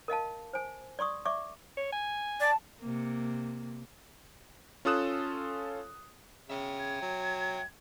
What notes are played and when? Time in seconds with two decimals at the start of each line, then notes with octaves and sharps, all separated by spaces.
0.08 A#4 D#5 F5 A5
0.53 C5 G#5
0.99 D5 C6 C#6 D#6
1.25 D5 E5 C#6 D6
1.77 C#5
1.92 G#5
2.40 D5 A5
2.80 C3 A#3
4.85 C#4 F4 A4 D#6 F#6 E7
6.50 C#3 E5 G5
6.79 G#6
7.02 F#3